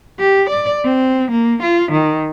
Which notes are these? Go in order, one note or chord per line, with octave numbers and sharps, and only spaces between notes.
G4
D5
C4
A#3
F4
D#3